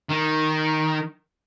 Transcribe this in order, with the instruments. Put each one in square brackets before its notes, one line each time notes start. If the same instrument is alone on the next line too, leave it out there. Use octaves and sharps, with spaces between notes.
[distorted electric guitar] D#3